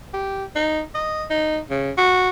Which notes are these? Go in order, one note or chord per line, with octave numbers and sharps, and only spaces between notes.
G4
D#4
D#5
D#4
C#3
F#4